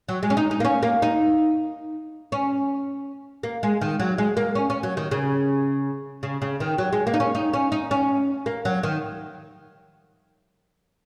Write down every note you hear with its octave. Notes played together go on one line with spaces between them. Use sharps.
F#3
G#3
C#4
D#4
D#4
A#3
C#4
A#3
D#4
C#4
A#3
G#3
D#3
F#3
G#3
A#3
C#4
C#4
F#3
D#3
C#3
C#3
C#3
D#3
F#3
G#3
A#3
D#4
C#4
D#4
C#4
D#4
C#4
A#3
F#3
D#3